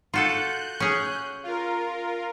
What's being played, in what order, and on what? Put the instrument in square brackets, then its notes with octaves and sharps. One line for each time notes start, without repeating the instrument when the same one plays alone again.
[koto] F4 F#4 A4 [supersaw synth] F#6 G6
[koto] C#4 G#4
[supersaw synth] F4 A#4